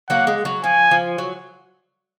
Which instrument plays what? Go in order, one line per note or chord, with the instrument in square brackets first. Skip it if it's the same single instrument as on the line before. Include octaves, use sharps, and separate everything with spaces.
[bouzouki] F#3 A#3 [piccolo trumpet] F#5
[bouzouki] G#3
F#3
[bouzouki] F3 [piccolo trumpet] G#5
[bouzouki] F3
F#3